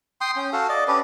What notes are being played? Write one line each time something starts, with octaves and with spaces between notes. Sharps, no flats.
G5 C6 D#6
C#4 G5
F#4 A4 F5
D5 D#5
C#4 D4 G4 B4